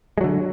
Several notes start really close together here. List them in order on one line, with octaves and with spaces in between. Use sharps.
G#3 F#3 D3